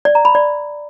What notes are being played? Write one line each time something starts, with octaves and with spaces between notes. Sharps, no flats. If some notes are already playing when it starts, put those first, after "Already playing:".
D5
A#5
B5
D5